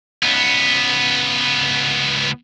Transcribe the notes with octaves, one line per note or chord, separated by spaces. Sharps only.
C#2 B3